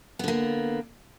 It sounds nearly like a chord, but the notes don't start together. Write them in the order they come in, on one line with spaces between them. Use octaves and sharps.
B3 D3 A#3